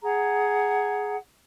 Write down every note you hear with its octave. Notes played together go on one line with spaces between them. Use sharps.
G#4 F#5 A#5